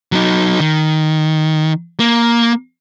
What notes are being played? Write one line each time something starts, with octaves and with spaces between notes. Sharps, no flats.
F#3 D#4
D#3
A#3